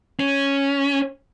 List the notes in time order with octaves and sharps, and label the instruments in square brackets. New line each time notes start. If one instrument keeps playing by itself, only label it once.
[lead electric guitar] C#4